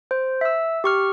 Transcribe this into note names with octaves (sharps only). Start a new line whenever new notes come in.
C5
E5 E6
G4 C#6 F6